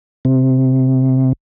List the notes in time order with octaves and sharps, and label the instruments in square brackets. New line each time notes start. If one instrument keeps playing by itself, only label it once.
[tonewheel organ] C3